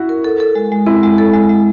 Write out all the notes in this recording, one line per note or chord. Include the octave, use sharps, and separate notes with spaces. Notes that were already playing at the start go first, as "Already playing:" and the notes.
Already playing: E4 F#4
A#4
A4
A4
G#3
G#3
C4 E4
G#3
A4
G#3
G#3